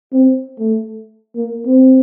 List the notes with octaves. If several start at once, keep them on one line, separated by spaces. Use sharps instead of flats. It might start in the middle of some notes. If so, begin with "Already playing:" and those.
C4
A3
A#3
C4